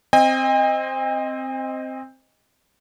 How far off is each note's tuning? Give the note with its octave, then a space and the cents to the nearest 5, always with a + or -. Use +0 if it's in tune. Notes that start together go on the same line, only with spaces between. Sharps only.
C4 +0 D#5 +0 G5 +45